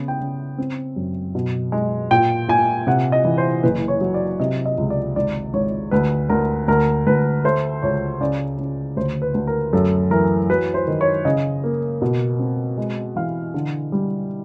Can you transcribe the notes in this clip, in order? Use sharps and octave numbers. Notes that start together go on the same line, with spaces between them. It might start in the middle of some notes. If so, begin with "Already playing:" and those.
Already playing: C#3 B3
G5
C#3
C4
F#2
B2
G#3
A#2 G5
A#2 G#5
C3 F#5
D#5
E3
C5
F#1 B4
C#5
F#3
D5
C3 D#5
D#5
C#2
D5
G#1 D5
G#1 C#5
D2 B4
D2 A#4
D2 A#4
D2 B4
A3 C5
C#2 C#5
C#3 D5
C#3
D2 C5
B4
D2
A#4
F#2 A4
E3 A#4
F#3 B4
C5
D#3
C#5
C#3 D#5
A#3
B2
C4
G#3
E3 F5
D3
G3